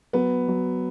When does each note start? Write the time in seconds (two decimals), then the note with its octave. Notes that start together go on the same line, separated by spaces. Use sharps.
0.13 F#3 B3
0.48 F#3